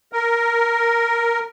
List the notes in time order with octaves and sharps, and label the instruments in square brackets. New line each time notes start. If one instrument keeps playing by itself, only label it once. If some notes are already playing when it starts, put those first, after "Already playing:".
[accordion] A#4